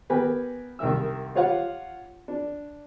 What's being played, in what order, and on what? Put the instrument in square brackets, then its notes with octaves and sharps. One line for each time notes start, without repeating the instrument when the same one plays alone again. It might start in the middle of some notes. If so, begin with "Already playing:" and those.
[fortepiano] B3 G4 A#4 B4 G5 G#5
C2 D#3 A#4 E5 E6
F4 G4 C#5 F5 F#5
D4